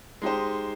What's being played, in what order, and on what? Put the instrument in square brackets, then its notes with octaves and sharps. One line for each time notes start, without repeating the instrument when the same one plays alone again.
[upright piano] G#3 D#4 G4 C5